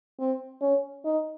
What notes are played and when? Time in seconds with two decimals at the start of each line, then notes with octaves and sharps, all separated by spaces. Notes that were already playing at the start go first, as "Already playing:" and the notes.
0.19 C4
0.61 C#4
1.05 D#4